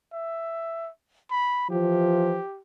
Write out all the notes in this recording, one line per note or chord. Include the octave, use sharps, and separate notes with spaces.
E5
B5
E3 F3 F4 G4